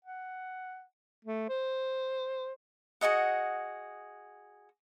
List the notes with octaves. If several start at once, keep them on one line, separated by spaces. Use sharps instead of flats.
F#5
A3
C5
F#4 G#4 D#5 F#5